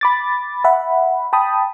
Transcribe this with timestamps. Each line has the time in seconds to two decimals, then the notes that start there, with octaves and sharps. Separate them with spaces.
0.01 B5 D6 A6
0.64 E5 F#5 B5
1.33 G5 A5 B5 D#6